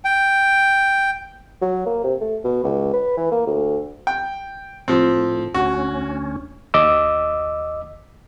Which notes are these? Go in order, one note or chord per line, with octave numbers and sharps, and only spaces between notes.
G5
F#3
A#3
C3
A3
B2
C#2
B4
E3
A#3
D2
G5
A2 F3 C4
D2 C#4 F#4
D#2 D#5 D6 E6